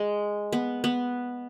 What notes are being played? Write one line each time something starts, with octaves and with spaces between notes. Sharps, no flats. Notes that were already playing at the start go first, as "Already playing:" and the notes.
Already playing: G#3
B3
B3